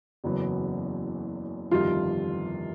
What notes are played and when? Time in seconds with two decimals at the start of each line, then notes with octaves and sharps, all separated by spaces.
0.24 F#1 E2 C#3 F#3 B3
1.71 G1 F2 C3 D#3 G3 F4